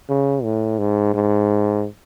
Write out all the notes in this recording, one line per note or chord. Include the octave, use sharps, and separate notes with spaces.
C#3
A2
G#2
G#2